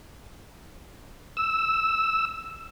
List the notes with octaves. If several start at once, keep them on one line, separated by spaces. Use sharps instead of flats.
E6